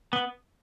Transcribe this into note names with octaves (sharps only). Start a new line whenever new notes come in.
B3